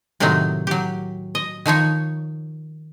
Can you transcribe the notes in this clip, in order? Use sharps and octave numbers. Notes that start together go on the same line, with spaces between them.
A2 C3 D#3 F#3 C4 D#4
F#3 G4
D#5
D#3 F3 D#4 C#5